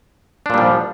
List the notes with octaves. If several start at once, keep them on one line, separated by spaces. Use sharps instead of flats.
A#2 F3 G3 D4